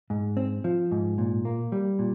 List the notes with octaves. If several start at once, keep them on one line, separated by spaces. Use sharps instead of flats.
G#2
C4
F3
G#2
A#2
A#3
G3
A#2